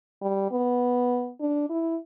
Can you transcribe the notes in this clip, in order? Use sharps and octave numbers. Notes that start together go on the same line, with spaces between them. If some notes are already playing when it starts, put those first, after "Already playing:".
G3
B3
D4
E4